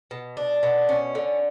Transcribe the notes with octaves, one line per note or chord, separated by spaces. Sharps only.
B2
D4
B2
C#4
D3